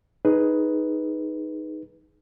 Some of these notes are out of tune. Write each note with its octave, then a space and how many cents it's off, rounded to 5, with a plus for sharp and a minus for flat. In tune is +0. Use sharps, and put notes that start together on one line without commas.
D#4 +0 G#4 +10 B4 +0